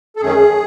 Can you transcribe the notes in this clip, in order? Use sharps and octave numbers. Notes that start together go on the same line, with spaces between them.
A4
F#2 D#3 A3 C#4 G#4